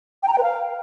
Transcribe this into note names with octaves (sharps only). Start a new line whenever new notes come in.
G5
A#5
G5
B4
F5